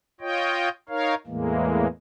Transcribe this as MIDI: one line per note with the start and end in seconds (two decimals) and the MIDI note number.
0.21 0.69 65
0.21 0.69 73
0.21 0.69 75
0.21 0.69 79
0.89 1.15 63
0.89 1.15 70
0.89 1.15 73
0.89 1.15 77
1.27 1.87 40
1.27 1.87 45
1.27 1.87 52
1.27 1.87 56
1.27 1.87 58